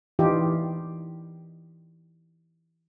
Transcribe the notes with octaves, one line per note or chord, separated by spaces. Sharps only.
E3 D#4 F4 G4